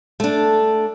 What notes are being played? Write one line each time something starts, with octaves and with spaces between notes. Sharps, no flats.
A3 D4